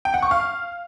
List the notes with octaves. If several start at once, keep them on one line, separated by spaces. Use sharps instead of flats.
G5
F#5
C#6
F5